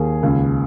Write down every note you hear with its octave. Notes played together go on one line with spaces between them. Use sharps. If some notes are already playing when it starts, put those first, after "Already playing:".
Already playing: D#2 G#4
C#2